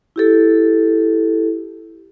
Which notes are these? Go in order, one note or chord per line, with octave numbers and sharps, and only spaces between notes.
E4 G4 A4